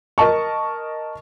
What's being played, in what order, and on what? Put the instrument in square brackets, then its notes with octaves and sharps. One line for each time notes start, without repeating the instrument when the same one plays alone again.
[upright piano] A#4 D#5 A5 C#6